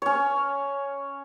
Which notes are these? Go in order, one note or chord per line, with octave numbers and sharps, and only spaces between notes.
C#4 C#5